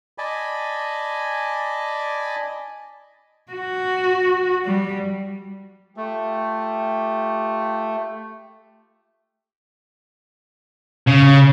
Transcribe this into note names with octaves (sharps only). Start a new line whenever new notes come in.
D5 D#5 G#5 A5 B5
F#4
G3
A3 F4 G4
C#3